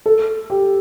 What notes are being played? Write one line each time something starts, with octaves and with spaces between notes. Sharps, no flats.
A4
G4